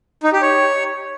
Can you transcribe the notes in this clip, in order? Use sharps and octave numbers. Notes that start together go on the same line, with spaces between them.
D#4
G4
C#5